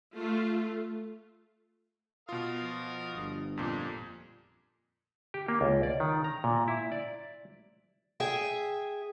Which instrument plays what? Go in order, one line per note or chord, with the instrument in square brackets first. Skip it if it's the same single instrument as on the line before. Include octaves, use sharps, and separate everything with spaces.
[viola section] A3 F4
[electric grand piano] B2 F4 [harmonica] A#4 F5 D#6
[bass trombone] F3
G1
[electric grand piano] F2 A#2 [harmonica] G#3
[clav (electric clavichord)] G4
A#3
C#2
D5
D#3
A#5
A#2
E4
D5
[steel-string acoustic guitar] G#4 E5 G5